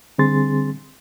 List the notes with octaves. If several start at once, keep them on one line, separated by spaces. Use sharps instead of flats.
D3 G3 C4 G#4 C6 A6